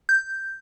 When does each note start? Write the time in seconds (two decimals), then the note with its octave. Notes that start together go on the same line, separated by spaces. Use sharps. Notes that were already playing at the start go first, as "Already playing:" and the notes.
0.09 G6